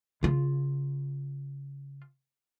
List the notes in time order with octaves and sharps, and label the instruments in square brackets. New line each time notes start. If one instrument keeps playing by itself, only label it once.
[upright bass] C#3 F4